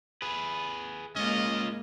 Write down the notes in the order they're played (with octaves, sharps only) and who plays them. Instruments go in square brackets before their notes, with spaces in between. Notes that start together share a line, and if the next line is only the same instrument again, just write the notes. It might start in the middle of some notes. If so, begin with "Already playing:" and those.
[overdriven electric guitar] G#4 B4
[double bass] G#3 A#3 [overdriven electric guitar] C#4 F4 [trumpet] D#5